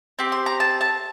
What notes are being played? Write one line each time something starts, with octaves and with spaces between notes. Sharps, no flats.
C4 G4
C6
A#5
A5
A5